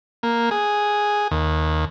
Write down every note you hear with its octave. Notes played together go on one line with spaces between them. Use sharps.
A#3
G#4
D#2